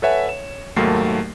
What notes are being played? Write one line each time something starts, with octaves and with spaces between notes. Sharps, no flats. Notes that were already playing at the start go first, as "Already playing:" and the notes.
A4 B4 C#5 E5 F#5 G#5
C#5 E7
D#2 G#2 F#3 A3 A#3 C7